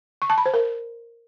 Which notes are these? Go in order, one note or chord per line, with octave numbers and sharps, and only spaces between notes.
C#6
A5
B5
C5
A#4